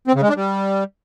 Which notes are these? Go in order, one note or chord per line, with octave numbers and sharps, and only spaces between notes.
C4
C#3
G#3
D4
G3